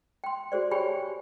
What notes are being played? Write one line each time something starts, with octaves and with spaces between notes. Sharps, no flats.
G5 C6
F#4 G#4 C5 D5
G4 G#4 C#5 G5 G#5 B5